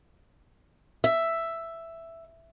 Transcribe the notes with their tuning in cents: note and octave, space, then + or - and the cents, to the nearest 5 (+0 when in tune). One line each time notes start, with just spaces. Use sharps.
E5 +5